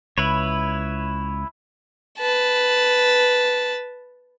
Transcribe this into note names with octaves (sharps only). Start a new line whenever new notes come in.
C#2 E4 B4 C#5
B4 A5